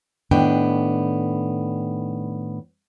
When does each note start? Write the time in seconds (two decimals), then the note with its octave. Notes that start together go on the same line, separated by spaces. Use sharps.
0.31 A2 D#3 B3 D4 G5